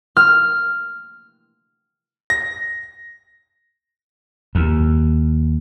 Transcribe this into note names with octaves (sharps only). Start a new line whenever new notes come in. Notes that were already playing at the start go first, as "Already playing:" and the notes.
F6
A#6
D#2